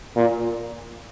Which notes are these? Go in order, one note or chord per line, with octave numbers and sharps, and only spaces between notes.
A#2